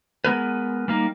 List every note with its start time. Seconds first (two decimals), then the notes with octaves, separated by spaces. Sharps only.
0.24 G#3 B3 A#4 B4
0.88 G3 A#3 D#4